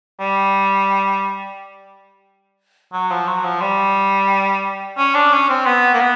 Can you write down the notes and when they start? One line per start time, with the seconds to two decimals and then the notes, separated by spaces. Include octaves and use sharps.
0.20 G3
2.93 F#3
3.11 F3
3.27 F#3
3.44 F3
3.61 G3
4.98 C#4
5.15 D4
5.32 C#4
5.50 C4
5.66 B3
5.94 A#3
6.00 B3